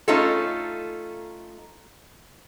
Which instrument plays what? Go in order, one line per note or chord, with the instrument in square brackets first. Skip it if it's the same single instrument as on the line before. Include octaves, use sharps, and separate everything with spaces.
[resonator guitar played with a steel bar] A3 C#4 D#4 F4 A4